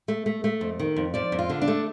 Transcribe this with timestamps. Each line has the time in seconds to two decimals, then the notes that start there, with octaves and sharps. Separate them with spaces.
0.08 A3
0.26 A3
0.44 A3
0.61 F2
0.80 D#3
0.96 F2
1.14 F3 D5
1.32 F2
1.39 F4
1.49 D3
1.62 D4
1.68 A3